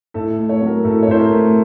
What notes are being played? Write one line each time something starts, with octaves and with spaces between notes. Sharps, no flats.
A2 A4
A3
C#5
F#3
A#4
A2 A4
C#5
A2 C5
A#4
A3